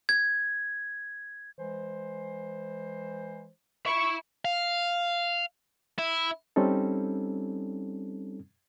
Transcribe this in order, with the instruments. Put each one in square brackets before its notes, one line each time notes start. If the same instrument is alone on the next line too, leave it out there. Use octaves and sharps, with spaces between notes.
[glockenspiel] G#6
[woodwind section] E3 G#3 C5
[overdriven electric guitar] E5 B5 [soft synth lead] C#6
[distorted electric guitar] F5
E4
[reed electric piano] G3 C4 C#4 D#4 A4